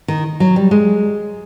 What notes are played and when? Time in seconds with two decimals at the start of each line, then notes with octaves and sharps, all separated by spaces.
0.08 D#3
0.40 F#3
0.56 G3
0.71 G#3